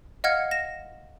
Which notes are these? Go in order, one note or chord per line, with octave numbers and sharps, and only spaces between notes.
D#5 F5 F#5 F6 G#6 C#7
A#6 E7